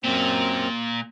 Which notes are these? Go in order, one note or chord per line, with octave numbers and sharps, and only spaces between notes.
F#2 A#2 C4